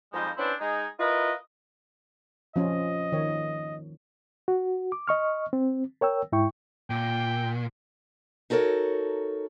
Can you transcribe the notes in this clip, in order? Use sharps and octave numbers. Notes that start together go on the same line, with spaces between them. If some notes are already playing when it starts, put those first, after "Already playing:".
F2 F3 G3 G#3 D#4 C5
B3 C#4 D4 E4 C5
G#3 D#4 G#4
E4 F4 A#4 B4 D#5
F3 C#4 F4 D#5
D#3 A#4 C#5
F#4
D6
D#5 C#6 F6
C4
A#4 C#5 G5 E6
G#2 E4 G5 C#6
A#2 G5
D#4 F#4 A4 A#4 C#5